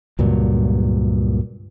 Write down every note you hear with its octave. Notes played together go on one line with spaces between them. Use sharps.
C#2 G2 A#2 F#3